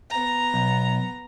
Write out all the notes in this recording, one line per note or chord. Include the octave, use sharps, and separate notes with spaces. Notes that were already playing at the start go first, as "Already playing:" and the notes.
B3 A#5
B1